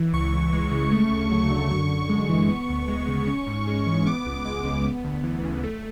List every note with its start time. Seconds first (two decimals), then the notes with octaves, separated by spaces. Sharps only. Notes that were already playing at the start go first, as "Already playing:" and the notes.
Already playing: E3
0.13 C#2 C#6
0.32 C#2
0.53 G#3
0.71 C#3
0.91 A3
1.11 D2
1.31 F#3
1.50 D3
1.70 F#2 C#6
1.90 F#2
2.09 G#3
2.29 E3
2.49 B3
2.69 D2
2.88 G#3
3.08 C#3
3.27 C#4
3.47 G#2
3.67 G#3
3.87 E3
4.07 B3 D6
4.26 C#2
4.45 G#3 D6
4.65 C#3
4.84 B3
5.04 D2
5.24 E3
5.43 C#3
5.63 A3